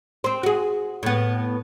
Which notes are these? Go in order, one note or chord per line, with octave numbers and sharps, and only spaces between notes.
C4 C5
F#4 G#4
A2 B3